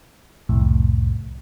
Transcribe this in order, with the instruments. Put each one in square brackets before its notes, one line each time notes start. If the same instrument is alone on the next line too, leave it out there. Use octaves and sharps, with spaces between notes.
[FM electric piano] C2 F2 A2